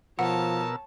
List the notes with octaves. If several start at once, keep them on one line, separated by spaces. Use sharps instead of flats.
B2 F3 A#4 C#5 F#5 A5 E6